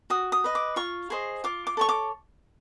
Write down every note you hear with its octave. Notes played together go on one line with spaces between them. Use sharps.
F#4 D#6
D#6
B4 D#5
D6
F4 C#6
G#4 C5 D#5
F4 D6
D6
A4 C#5 C#6
D6